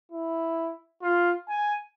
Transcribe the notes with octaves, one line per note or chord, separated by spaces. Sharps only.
E4
F4
G#5